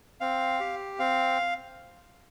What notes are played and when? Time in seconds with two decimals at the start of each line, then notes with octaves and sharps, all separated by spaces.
0.21 C4 F5
0.60 G4
0.99 C4 F5